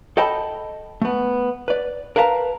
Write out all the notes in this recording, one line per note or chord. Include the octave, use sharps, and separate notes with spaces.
A4 D#5 G5 A5 B5
A3 B3
B4 D5
A#4 B4 F5 A5 A#5